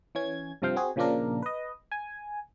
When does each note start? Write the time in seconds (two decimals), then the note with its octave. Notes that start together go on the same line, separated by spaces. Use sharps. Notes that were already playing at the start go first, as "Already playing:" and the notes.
0.15 E3 C#4 G#6
0.62 G2 C3 F3 C4 F5 G5
0.76 C4 F#4 G#4
0.96 A#2 C#3 F3 A#3 D4 A#4
1.42 B4 D#5
1.92 G#5